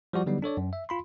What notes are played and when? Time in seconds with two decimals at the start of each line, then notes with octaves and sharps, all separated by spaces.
0.13 F3 G3 F#4 D5
0.26 D3 F#3 G3 B3 D#4
0.42 D4 A4 C#5 D5
0.57 F#2
0.73 E5
0.89 F4 B5 C6